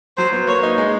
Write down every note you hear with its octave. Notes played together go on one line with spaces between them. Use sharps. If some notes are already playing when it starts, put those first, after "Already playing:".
F#3 C5
B3
A#3 C#5
D#4
G#3